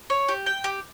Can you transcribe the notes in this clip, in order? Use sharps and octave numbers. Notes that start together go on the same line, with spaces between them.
C#5
G4
G5
G4